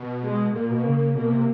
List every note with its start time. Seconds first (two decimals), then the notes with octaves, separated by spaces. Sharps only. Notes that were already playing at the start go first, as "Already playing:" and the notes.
Already playing: B2
0.23 G#3
0.54 A#2 A#3
0.70 B2
0.85 C#3
1.15 B2 A#3
1.30 C3